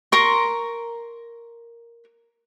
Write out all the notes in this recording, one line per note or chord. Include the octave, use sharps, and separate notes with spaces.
A#4 A#5 C6 C#6